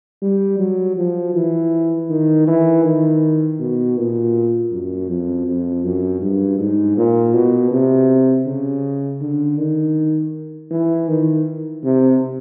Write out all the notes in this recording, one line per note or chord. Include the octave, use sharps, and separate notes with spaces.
G3
F#3
F3
E3
D#3
E3
D#3
B2
A#2
F#2
F2
F2
F#2
G2
G#2
A#2
B2
C3
C#3
D3
D#3
E3
D#3
C3